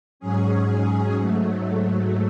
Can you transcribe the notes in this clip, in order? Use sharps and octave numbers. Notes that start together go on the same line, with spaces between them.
G#2 F#3 C#4 G#4
G#2 F#3 A3